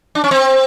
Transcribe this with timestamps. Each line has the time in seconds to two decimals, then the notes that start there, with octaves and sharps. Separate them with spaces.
0.15 D4
0.24 C#4
0.31 C4